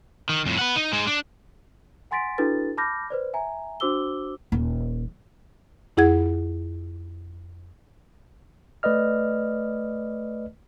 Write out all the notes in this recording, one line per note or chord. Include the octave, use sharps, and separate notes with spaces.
D#3
F2 A2
B4 F#5
D#4
G#3 D#4
D4
F#5 G#5 C6 A6 B6 D7
D4 E4 F#4 A4 B4 A6
A5 B5 D6 F6 G6 A#6
B4 C5 D5
E5 G#5 A#5
D4 F#4 C5 D6 E6 G7
D#1
F2 E4 G#4 F#5 G#6
A3 B4 D5 D#5 F6